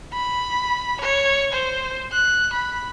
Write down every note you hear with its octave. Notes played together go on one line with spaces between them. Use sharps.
B5
C#5
C5
F#6
B5